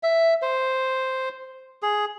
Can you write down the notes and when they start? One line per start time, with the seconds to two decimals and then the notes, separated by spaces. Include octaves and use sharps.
0.03 E5
0.42 C5
1.83 G#4